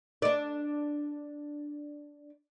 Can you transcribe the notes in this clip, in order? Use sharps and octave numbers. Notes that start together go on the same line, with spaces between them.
D4 D5